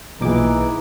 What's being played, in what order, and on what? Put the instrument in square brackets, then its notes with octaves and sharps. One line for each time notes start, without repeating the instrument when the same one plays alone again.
[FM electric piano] B1 A#2 D6 [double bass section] E3 [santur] D#4 G#4